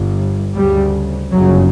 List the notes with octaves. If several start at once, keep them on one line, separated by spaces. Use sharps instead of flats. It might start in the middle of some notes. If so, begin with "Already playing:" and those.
Already playing: G1 G2
D2 C#3 G3
G1 F#2 C#3 F#3